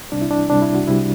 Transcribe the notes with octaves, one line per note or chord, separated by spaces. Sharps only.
C2 C3 G3 D4
E4
D4
C2 C3 G3 D4
E4
F#4
C2 C3 G3 E4